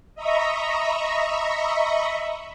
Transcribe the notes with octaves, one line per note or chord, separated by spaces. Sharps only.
D#5 E5 A#5 B5 C#6